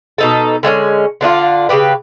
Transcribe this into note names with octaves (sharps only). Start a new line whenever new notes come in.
B2 D#4 A4
D3 G#3 A3 C#4
D3 D4 D#4 F4
C#3 G3 G4 B4